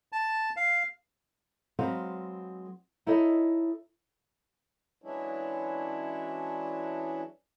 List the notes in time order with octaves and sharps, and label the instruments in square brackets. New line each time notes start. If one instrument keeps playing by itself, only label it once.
[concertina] A5
F5
[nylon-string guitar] F#3 G#3 C4 B4 C5 F5
D#4 E4 A4 C#5 D#5
[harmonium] E3 F#3 G#3 C#4 D4 E4